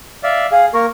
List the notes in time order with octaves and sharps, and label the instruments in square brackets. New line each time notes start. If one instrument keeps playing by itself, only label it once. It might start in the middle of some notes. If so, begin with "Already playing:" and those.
[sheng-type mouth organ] D5 E5 F5
[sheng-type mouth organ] G#4 [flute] F5
[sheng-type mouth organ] A#3 A#4 [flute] C#6